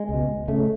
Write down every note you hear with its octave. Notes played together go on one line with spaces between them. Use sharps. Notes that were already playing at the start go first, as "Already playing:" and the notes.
Already playing: G#3
C#2 B2
C#3 A3